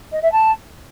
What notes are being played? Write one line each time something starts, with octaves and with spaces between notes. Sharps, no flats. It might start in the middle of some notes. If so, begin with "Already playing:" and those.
D#5
E5
A5